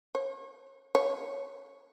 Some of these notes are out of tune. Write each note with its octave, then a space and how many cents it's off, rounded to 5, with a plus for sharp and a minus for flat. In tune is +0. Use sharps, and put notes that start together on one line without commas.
C#5 -35
C#5 +0